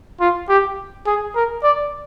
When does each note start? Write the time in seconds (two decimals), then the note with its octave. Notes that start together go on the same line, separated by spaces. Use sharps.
0.20 F4
0.49 G4
1.06 G#4
1.35 A#4
1.63 D5